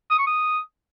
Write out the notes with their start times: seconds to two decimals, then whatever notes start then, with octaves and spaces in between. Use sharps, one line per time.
0.10 D#6
0.19 C#6
0.27 D#6